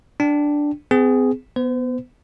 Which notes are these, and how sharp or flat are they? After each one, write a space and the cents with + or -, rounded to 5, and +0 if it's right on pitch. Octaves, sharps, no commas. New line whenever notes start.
D4 +0 G5 +0
C4 -45 G#4 +0
B3 +0 C5 -40